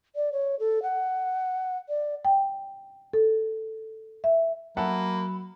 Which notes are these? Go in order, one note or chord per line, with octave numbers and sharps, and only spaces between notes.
D5
C#5
A4
F#5
D5
G5
A4
E5
F#3 A#3 E5 F#5 A5 B5